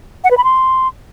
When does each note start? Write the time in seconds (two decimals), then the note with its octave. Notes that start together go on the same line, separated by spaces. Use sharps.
0.24 F#5
0.31 B4
0.37 B5
0.44 C6